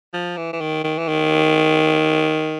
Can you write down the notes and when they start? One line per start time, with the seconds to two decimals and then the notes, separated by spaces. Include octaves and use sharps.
0.14 F3
0.37 E3
0.53 E3
0.61 D#3
0.84 D#3
0.98 E3
1.08 D#3